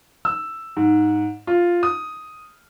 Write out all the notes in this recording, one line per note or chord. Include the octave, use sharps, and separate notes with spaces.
E6
G#2
F4
D#6